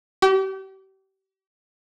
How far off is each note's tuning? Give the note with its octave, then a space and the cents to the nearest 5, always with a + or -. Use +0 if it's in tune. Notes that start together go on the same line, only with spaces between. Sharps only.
G4 -35